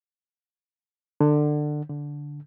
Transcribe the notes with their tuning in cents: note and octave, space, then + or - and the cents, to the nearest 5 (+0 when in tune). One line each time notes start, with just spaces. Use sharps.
D3 +20
D3 -10